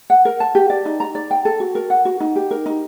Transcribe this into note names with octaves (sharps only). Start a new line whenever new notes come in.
F#5
A#4
A5
G4
D5
D#4
A#5
D5
G5
A4
F#4
A#4
F#5
F#4
D#4
G4
A#4
D#4